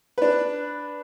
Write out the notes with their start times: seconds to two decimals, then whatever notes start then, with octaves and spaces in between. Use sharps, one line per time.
0.18 D4 B4